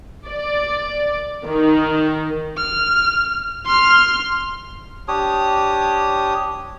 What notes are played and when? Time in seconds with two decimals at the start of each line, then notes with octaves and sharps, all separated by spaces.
0.28 D5
1.46 D#3
2.57 F6
3.65 C6 F6
5.08 D4 G4 C#5 D#6